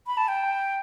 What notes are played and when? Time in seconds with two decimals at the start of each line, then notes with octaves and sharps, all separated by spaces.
0.07 B5
0.17 A5
0.28 G5